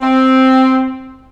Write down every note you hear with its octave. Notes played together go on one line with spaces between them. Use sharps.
C4